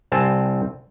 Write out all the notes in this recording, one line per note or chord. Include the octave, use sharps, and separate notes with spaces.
C2 C4 G#5 A5